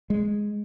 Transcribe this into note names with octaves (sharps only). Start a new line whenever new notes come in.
G#3